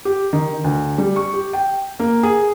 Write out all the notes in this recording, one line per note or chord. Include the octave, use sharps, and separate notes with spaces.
G4
D#3
D2
G3
C#6
G4
G5
A#3
G#4